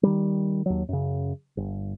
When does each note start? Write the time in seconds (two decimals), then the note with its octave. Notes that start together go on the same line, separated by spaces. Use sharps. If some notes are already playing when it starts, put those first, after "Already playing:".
0.03 D#3 G3
0.66 D#2 F#3
0.89 F#2 C#3
1.57 G1